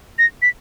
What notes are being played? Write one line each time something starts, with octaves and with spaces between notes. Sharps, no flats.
A#6
B6